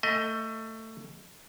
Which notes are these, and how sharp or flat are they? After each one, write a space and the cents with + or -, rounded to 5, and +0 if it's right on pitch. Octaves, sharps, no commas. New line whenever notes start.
A3 +20 D#5 +20